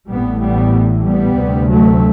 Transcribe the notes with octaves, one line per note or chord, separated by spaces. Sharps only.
A1 A2 G3 B3
G3 B3
G3 B3
D2 C3
F#3 A3